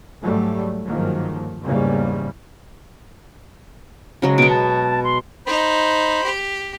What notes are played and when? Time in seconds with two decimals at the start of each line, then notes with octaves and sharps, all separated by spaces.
0.22 G#2 F#3 G3 A3
0.85 G1 G#2 D#3 F3 F#3 A#3
1.64 E2 G#2 C#3 G3 A#3
4.22 C#3 F#3 G#3
4.38 B2 B3 D7
4.50 A5
5.04 C6
5.46 D#4 C5 B5
6.23 G4